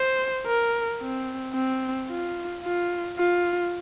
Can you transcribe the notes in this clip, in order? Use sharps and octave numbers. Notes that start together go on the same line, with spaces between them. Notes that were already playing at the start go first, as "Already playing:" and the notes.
Already playing: C5
A#4
C4
C4
F4
F4
F4